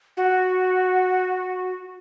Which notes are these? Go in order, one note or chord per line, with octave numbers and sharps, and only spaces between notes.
F#4